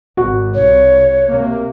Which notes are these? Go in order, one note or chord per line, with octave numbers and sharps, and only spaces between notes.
G#1 F#4
C2 C#5
C3 A#3